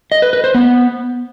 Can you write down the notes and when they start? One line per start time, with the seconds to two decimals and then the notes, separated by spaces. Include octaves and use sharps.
0.12 D#5
0.22 B4
0.33 B4
0.44 C5
0.55 B3